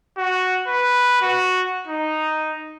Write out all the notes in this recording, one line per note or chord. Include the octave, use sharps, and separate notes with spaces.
F#4
B4
F#4
D#4